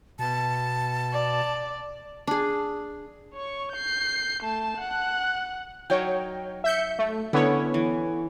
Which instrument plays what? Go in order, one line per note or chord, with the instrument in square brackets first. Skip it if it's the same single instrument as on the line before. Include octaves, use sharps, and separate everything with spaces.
[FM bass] B2 [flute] A5
[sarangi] D5
[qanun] D4 G#4
[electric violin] C#5 C#6
G6 C7
A3 A5
F#5 F#6
[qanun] F#3 D#4 A#4 [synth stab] C#5 G5
[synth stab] E5 G6 C#7
A3
[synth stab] D3 B3 C#5 [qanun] C#4 E4
[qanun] E3